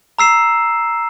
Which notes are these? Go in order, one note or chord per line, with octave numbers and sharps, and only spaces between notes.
A#5 E6 C7 E7